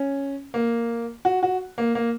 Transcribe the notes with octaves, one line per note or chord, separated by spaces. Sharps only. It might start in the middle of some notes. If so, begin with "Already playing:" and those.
Already playing: C#4
A#3
F#4
F#4
A#3
A#3